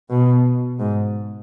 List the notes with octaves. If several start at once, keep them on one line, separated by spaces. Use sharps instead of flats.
B2
G#2